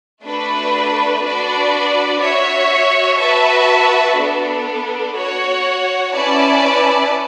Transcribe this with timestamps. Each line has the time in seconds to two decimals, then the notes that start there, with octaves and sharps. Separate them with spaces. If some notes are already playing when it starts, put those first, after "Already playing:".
0.23 A3 D4 F#4 B4
1.22 D4 F#4 B4 D5
2.20 F#4 C#5 E5
3.19 F#4 B4 E5 A5
4.17 B3 D4 A4
5.16 F#4 C#5 F#5
6.14 C#4 E4 B4 D5 A5